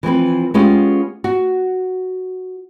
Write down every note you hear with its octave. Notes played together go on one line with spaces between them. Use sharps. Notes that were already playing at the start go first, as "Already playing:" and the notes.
E3 F3 C4 B4
G#3 B3 C#4 F4 G4
F#4